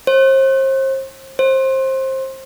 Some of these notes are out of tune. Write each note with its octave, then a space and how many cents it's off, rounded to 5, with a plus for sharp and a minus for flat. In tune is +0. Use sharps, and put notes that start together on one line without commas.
C5 +35
C5 +20